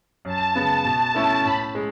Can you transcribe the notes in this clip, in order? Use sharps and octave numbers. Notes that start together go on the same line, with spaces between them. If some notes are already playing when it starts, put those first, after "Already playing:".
F#2 A5
C#3 G#3 B3
B2
A3 C#4 E4
A2 B5
G#3